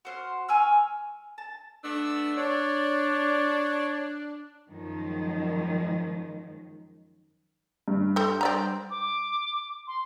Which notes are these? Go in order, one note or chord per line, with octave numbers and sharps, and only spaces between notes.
F#4 C5 F6
G#5 C#6 E6 F6
A5
A3 B3 D4 E6
D4 C#5 D5
F#2 D#3 F3 G#3
G2
C4 A4
C4 D5 A#5
D6
C6